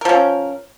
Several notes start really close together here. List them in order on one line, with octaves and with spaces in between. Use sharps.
A#4 F3 C#4